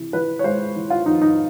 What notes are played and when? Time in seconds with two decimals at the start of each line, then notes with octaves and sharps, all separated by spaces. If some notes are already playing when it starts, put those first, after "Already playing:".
Already playing: C3 E3
0.13 E3 B4
0.39 C#5
0.44 G#3 C5
0.75 E3
0.90 F4
1.06 F2 D#4
1.21 D#4